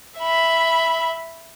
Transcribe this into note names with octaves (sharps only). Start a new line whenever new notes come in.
E5 B5